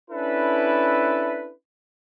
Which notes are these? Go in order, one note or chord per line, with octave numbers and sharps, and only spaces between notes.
C#4 D4 E4 A4 B4